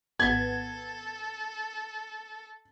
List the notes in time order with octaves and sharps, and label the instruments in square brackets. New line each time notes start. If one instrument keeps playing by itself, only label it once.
[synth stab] G#1 B3 [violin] A4 [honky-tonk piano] G#6